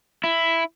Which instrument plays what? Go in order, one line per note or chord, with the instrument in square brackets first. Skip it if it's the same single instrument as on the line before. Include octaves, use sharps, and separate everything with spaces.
[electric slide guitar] E4